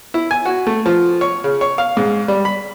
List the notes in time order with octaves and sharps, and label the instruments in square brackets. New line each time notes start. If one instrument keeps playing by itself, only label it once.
[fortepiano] E4
G#5
F#4
A3
F3
C#5
C#3
C#5
F5
G#2
G3
B5